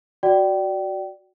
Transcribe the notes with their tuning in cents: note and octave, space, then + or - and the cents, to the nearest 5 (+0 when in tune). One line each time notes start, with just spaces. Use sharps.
F#4 +0 D5 +0 G5 -25